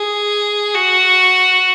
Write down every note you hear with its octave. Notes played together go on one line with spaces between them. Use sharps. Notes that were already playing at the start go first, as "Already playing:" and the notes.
Already playing: G#4
F#4